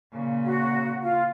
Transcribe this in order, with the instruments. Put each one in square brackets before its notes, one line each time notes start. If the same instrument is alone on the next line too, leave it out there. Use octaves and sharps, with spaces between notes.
[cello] A#2 C#3
[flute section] F#4
F4